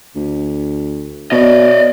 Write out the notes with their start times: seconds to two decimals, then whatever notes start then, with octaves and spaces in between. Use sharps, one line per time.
0.15 D2
1.32 B2 D5 D#5